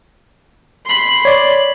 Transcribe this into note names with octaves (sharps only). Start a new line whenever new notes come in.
B5 C6
C#5 D5